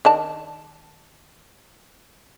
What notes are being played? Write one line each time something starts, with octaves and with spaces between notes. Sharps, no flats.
D#3 D4 A5